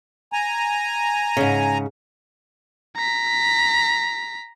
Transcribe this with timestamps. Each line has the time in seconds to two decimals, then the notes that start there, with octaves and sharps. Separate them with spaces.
0.33 G#5 A#5
1.37 G#2 C#3
2.96 A#5 B6